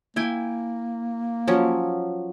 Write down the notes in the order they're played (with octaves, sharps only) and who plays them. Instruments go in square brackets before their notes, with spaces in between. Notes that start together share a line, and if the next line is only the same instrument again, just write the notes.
[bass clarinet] A#3 [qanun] E4 G5 G#5
[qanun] F3 F#3 C#4